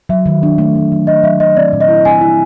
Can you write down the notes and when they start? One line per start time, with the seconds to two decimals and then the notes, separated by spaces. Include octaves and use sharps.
0.09 F#3 E5
0.26 D#3
0.43 D4
0.58 A3
0.75 F#3
0.92 F#3
1.07 A3 D#5
1.23 F#3 E5
1.40 F#3 D#5
1.57 C4 D5
1.73 A#2
1.81 D#5
1.88 E4
2.05 C4 G#5
2.21 E4